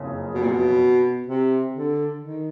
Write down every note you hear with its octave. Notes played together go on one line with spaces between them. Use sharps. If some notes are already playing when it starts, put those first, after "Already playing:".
Already playing: F#1 F2 C#3
B2
A#2
B2
C3
D3
D#3